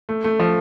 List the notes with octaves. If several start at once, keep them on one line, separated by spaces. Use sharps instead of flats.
A3
A3
F3